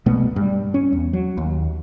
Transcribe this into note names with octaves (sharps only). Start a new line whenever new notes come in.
B1 B2 A3 B3
G2 G3
C#4
E2
F#3
D#2